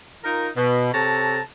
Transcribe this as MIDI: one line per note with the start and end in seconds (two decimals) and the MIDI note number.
0.24 0.49 63
0.24 0.49 65
0.24 0.49 70
0.57 0.91 47
0.94 1.40 48
0.94 1.40 69
0.94 1.40 73
0.94 1.40 81
0.94 1.40 82